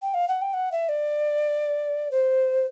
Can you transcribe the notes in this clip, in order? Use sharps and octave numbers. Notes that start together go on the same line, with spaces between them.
G5
F5
F#5
G5
F#5
E5
D5
C5